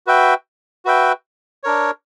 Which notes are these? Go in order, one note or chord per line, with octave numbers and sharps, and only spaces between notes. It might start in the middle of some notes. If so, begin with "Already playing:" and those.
F#4 B4 E5 G5
F#4 B4 E5 G5
D4 A#4 C#5